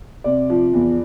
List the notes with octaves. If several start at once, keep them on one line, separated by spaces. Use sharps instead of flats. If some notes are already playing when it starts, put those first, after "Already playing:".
C3 D5
F3
E2